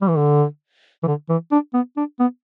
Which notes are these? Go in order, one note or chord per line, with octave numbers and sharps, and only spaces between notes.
G3
E3
D3
E3
D3
E3
D4
B3
D4
B3